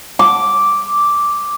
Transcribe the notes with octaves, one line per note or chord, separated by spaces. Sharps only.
D6